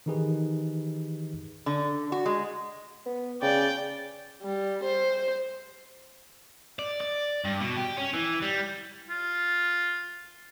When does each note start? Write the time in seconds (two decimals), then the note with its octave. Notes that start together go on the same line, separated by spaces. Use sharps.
0.06 D#3 E3 D#4 G4 G#4 B4
1.66 D3
2.12 F#4
2.26 G#3
3.06 B3
3.42 C#3 D5 G5
4.42 G3
4.84 C5
6.79 D5
7.01 D5
7.45 G2
7.61 B2
7.77 G4
7.97 C#4
8.14 E3
8.42 G3
9.10 F4